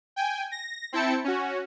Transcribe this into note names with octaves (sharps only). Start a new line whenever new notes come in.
G5 G#5
A#6
C4 E4 G5 A5 C#7
C#4 F#4